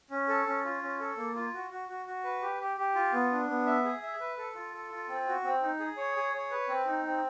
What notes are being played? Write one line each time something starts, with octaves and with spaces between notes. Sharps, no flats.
C#4
A4
C#4
F4
C#4
A4
A#3
F4
F#4
F#4
F#4
F#4
B4
G4
G4
G4
F4
B3
D4
B3
E5
G#4
E5
B4
A4
F4
A4
F4
C4
F#4
C4
D#4
G#4
C#5
G#4
C#5
B4
C4
D#4
C4